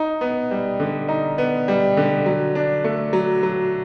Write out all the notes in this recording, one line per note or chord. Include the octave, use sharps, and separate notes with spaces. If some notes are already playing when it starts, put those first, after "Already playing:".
Already playing: D#4
B3
G3
D3
D#4
B3
G3
D3
F#3
D4
A3
F#3
F#3